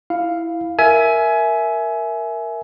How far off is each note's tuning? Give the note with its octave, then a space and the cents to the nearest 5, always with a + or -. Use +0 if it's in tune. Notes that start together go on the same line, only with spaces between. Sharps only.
E4 +0 F5 +0
A#4 +0 E5 +0 G#5 +20